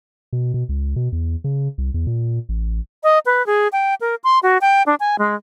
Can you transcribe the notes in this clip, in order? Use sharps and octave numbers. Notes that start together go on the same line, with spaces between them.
B2
B2
C#2
B2
E2
C#3
C2
E2
A#2
A1
D#5
B4
G#4
G5
A#4
C6
F#4
G5
D4
G#5
G#3